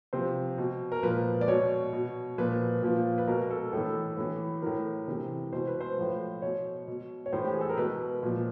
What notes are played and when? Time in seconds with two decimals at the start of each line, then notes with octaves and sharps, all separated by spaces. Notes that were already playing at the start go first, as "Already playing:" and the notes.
0.13 C3 F3 C5
0.58 B2
0.92 A#4
1.03 A#2 F3 B4
1.41 D5
1.48 B2 C#5
1.93 B2
2.38 A#2 F3 B4
2.82 A#2 F3
3.18 B4
3.27 B2 A#4
3.50 A4
3.73 A2 E3 A4
4.17 A2 E3
4.62 A2 E3 A#4
5.08 C3 E3
5.53 B2 C5
5.67 B4
5.81 C5
5.98 A2 F3
6.42 B2 C#5
6.88 B2
7.26 C#5
7.33 A2 E3 C5
7.45 G4
7.53 G#4
7.61 A4
7.69 A#4
7.77 B2 B4
8.23 A#2 F3